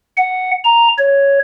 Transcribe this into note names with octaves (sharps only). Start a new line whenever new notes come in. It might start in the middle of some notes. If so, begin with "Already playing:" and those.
F#5
A#5
C#5